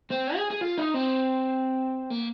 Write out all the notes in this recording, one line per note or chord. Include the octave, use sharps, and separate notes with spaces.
C4
G#4
G#4
F4
D#4
C4
A#3